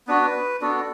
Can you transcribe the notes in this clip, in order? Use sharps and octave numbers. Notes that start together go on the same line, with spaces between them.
B3 D4 F#4 B4
B3 D4 F#4 A4